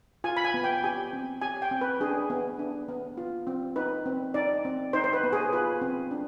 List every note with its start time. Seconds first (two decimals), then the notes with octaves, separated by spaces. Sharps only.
0.24 F4 G#5
0.37 B5
0.44 G#5
0.54 B3
0.64 G5
0.84 G4 G#5
1.13 C4
1.41 G4 G#5
1.62 G5
1.71 C4
1.81 B4
2.00 D4 G#4
2.30 B3
2.59 D4
2.88 B3
3.17 F4
3.47 C4
3.76 D#4 B4
4.06 C4
4.34 D#4 D5
4.65 C4
4.93 D#4 C5
5.04 C5
5.13 B4
5.23 B3
5.33 G#4
5.53 F4 B4
5.81 C4
6.11 D4